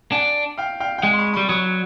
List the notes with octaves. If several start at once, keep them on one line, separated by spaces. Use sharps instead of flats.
D4 F#5 G#5
F5 G5
F5 G5
G5
G#3 F#5 G#5
C6
B5 C#6
B5 C#6
G3
F#3 C#6 D#6